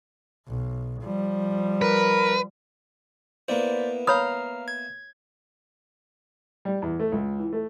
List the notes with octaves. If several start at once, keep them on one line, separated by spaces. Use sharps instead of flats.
B1
F3 G3
A#4 B4
A#3 B3 E4 C5 D5
C#5 F5 A#5 B5 D#6 F6
G#6
G3
E2
A3
C#2
E3
A3